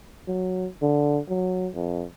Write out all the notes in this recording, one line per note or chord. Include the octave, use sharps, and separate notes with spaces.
F#3
D3
F#3
F2